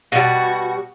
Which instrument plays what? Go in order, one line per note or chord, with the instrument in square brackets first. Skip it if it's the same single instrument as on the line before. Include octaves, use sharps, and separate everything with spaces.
[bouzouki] B2 G3 [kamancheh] F#4